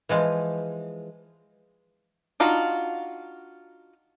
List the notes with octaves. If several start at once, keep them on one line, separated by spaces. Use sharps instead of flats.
E3 F3 G#3
D4 D#4 F4 F#4